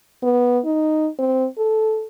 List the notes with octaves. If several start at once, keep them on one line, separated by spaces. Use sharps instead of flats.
B3
D#4
C4
A4